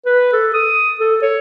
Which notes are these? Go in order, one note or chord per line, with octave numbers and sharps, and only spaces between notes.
B4
A4
D#6
A4
C#5